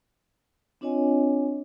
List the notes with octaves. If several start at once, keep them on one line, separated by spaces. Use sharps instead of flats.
C4 D4 F4 C#5 D#5 G#5